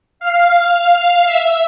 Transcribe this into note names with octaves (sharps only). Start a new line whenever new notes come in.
F5
F5
E5